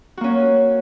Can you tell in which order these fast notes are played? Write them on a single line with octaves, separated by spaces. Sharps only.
F#4 A#3 C#4